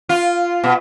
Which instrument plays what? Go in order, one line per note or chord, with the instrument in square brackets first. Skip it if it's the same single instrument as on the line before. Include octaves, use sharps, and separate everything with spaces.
[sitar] F4
B2